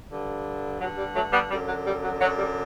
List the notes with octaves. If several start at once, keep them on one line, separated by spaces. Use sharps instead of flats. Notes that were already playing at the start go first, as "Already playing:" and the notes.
G2 D3
G2 D3 F#3
G3
F#3 A3
G3 B3
F#2 D3 G3
F#3
G3
F#3
F#2 D3 F#3
G3